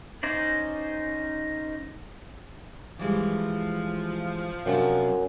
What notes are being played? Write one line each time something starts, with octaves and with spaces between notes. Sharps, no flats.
C#4 D#4 C5 D5
E3 F3 G3 G#3
F#2 C3 F3 F#3 D4